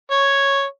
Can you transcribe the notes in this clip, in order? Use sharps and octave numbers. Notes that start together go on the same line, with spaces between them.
C#5